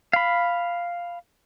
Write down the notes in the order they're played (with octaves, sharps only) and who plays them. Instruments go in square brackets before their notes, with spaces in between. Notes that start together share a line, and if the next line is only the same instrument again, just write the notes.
[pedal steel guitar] F5 B5